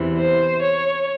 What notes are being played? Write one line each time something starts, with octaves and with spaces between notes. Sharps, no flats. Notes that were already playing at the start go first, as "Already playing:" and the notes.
Already playing: E2 C3 E3
C5
C#5